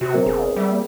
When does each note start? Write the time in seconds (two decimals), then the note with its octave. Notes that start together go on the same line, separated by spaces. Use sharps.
0.01 C3 F#4
0.14 F#3 B3 C4 A#4
0.26 E1 D4 G#4
0.56 G3 E5
0.70 A#3